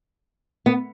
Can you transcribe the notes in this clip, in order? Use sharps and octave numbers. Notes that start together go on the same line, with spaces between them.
B3